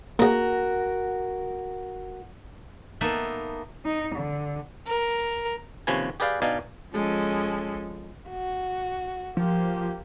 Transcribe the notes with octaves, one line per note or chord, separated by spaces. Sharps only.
A#3 F#4 G#4 A#4
A#3 B3 D#4 A4 E5
D#4
D3
A#4
D#2 C3 F3 C#4 B4 G#5
G4 G#4 B4 D5 F5 G5
B2 D4 D#4 D5 F5 G#5
F3 G#3 C#4 A4
F#4
F3 A#3 G4